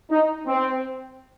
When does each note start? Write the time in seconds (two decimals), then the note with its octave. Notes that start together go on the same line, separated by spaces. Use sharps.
0.10 D#4
0.47 C4